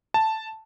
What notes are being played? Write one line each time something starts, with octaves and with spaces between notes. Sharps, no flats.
A5